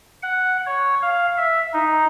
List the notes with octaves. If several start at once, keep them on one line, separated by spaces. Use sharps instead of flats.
F#5
C#5
F5
E5
D#4